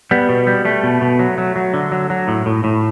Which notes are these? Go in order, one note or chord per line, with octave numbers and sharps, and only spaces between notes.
G3 B3
B2
G3
G3 A3
B2
B2
F#3
F#3
F#3
D3
F#3
F#3
A2
A2
A2